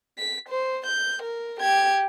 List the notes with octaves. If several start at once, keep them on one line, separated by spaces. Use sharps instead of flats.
B6
C5
G6
A#4
G4 G#6